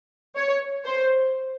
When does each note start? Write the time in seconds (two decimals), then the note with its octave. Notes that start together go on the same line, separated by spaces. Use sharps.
0.36 C#5
0.85 C5